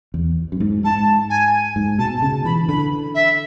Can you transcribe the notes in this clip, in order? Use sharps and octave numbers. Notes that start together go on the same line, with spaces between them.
E2
F#2
G#2
G#2 A5
G#5
G#2
B2 A5
C#3 A5
E3 B5
D3 B5
E5